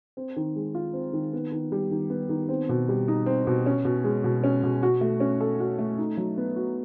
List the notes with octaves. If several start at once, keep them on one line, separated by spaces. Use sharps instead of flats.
C4
D#3
G#3
F4
C4
D#3
B3
D#3
G3
D#3
B3
D#3
C4
B2
G3
D#4
C4
B2
C#4
B2
G#3
B2
C#4
B2
F#4
A3
C#4
A4
F#4
A3
D#4
F#3
B3
F#4